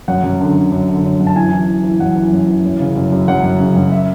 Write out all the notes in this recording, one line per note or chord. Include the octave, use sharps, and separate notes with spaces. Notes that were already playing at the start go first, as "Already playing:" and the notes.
F#2 F#5
F#2
D3
D3
F#2
D3
F#2
F#2
A5
E3 G#5
E3
E3
E3
F#2 F#5
E3
F#2
E3
F#2
C#3
F#2
F#2
F#2 F#5
F#2
C#3
F#2
E5